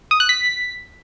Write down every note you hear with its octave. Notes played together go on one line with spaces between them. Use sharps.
D#6
F#6
B6